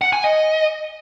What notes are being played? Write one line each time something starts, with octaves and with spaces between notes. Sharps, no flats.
F#5
G#5
D#5